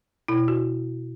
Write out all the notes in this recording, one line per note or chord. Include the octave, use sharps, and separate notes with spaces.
B2 E4
F#4